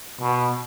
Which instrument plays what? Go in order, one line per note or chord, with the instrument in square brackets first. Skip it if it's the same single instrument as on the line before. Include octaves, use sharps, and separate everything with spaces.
[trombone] B2